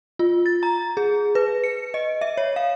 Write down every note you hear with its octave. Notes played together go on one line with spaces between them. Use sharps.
F4
A6
A#5
G#4
B4
C#7
D#5
E5
C#5
F5